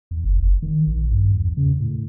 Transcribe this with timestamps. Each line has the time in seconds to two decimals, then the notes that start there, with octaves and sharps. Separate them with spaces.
0.11 E2
0.24 F#1
0.40 F#1
0.62 D#3
0.87 A#1
1.12 G2
1.34 E2
1.57 C#3
1.80 A2